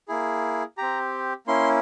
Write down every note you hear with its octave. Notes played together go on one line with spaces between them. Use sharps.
A#3 E4 G#4
C4 G4 A#5
A#3 C#4 E4 C6